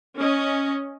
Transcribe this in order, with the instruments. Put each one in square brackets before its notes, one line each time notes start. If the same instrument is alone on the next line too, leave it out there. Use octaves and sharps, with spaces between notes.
[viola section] C#4 D#5